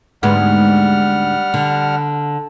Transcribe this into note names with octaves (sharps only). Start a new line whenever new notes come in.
D2 G#2 G3 B3 F#5 F6
D3